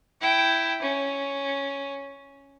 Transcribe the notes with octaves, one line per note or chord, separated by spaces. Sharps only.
E4 G5
C#4